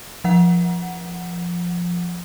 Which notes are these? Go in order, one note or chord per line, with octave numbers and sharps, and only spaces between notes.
F3 F#5